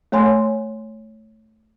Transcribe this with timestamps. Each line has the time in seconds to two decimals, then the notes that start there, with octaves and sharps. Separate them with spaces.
0.12 A3 C#5 G#5 C6